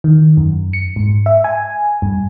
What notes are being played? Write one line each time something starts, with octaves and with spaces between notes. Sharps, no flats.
D#3
F#2
C#7
G#2
E5
G#5
G2